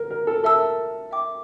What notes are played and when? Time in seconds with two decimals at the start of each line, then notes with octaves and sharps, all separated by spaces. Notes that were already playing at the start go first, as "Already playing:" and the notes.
Already playing: A#4
0.10 A#4
0.27 A4
0.43 A4 A#4 E5 A5 E6
1.11 E5 G5 D6